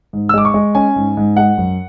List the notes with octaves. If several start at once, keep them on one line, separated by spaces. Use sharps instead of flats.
G#2
E6
G#3 D6
C#6
G#3
C#4 G#5
G#2
G#2
G#3 F#5
F#2